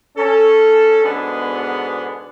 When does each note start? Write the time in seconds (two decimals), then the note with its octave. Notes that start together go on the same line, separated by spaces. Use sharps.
0.17 C#4 A4
1.04 G#2 B2 D3 B3 D4 G#4